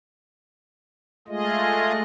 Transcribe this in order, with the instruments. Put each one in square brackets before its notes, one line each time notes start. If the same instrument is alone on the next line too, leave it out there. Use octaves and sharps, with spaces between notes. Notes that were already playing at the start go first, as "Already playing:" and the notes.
[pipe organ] G#3 A3 F4 G#4 D#5